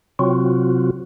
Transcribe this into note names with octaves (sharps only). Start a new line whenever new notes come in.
C3 F#3 C4 F4 F#4